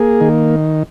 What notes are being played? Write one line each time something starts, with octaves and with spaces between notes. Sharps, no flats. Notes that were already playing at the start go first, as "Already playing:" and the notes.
Already playing: A#3 G#4
D#3